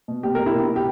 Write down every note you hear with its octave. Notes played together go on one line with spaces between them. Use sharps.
B2
B2 G4
B2 A#4
E4 G4
B2
B2
G4